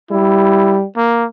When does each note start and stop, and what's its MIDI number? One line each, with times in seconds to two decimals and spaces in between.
0.11 0.83 55
0.11 0.78 64
0.97 1.26 58